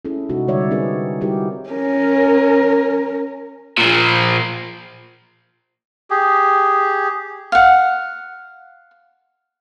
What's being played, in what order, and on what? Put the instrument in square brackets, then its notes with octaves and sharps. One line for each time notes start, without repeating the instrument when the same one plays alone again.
[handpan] C#4 E4 G#4 A4
C3 G#3 D#4 F#4
D3 G3 C#5 D5 E5
C4 D#4 G#4 A#4 B4
G3 D#4 E4 F#4 G4 A#4
[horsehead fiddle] C#4 A#4
[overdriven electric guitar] A#2 F3
[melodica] G4 G#4
[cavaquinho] F5 F#5